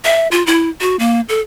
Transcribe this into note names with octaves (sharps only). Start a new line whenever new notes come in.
E5
F4
E4
F#4
A#3
A4